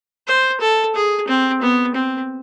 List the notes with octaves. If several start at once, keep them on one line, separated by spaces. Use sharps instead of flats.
C5
A4
G#4
C4
B3
C4